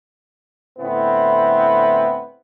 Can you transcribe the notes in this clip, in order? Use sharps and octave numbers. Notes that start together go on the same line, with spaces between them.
A2 D3 B3 C4 E4